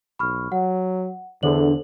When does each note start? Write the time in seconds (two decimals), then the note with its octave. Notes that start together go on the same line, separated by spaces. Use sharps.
0.19 B1 B5 C#6 F6
0.52 F#3 F#5
1.43 E2 D3 A4 C5 F#7